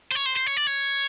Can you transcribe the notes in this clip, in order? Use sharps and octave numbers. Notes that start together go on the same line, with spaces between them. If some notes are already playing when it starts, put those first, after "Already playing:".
C5
C#5
C5
C5
C#5
D5
C#5